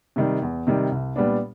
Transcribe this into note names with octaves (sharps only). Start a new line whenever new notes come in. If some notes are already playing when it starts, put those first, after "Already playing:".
C3 D#3 G3
E2
C3 D#3 G3
C2
A#2 G3 B3 D4